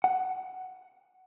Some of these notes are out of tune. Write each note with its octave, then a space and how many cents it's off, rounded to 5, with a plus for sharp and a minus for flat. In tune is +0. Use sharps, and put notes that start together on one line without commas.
F#5 +10